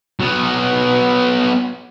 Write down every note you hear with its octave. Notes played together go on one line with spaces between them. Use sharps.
F#3 B3